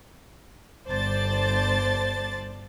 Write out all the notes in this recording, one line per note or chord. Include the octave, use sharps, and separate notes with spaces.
G1 C5 D5 A5 A6